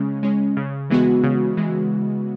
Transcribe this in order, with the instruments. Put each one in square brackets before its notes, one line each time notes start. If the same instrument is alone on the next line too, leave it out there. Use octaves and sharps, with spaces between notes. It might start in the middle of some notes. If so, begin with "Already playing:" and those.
Already playing: [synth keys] C#3 G#3 C#4
G#3 C#4
C#3
E3 G#3 B3 F#4
C#3
E3 G#3